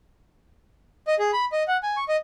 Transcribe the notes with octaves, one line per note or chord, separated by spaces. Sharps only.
D#5
G#4
B5
D#5
F#5
G#5
C#6
D#5